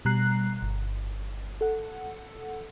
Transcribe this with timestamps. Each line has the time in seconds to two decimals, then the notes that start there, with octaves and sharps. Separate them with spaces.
0.05 B2 G3 A#5 F#6 C7
0.62 G1
1.61 A4 F#5